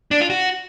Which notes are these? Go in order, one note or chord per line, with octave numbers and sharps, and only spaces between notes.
D4
F4
F#4